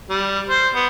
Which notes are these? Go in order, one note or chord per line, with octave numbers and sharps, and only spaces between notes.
G3
C5
B3